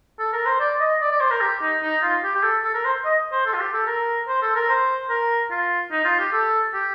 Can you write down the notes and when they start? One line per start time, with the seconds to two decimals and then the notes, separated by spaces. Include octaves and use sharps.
0.19 A4
0.33 A#4
0.46 C5
0.60 D5
0.80 D#5
1.01 D5
1.11 D5
1.20 C5
1.30 A#4
1.41 G4
1.62 D#4
1.82 D#4
2.02 F4
2.24 G4
2.35 G4
2.43 A4
2.64 A4
2.74 A#4
2.85 C5
3.05 D#5
3.32 C5
3.46 A4
3.54 F4
3.60 G4
3.73 A4
3.87 A#4
4.28 C5
4.42 A4
4.55 A#4
4.69 C5
5.09 A#4
5.51 F4
5.91 D#4
6.05 F4
6.19 G4
6.32 A4
6.73 G4